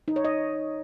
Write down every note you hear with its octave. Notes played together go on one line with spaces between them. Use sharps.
D#4
C#5
D#5